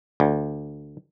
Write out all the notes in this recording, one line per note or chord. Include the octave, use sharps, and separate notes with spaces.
D2